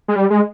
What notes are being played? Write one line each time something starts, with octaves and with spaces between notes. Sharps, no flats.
G#3
G3
G#3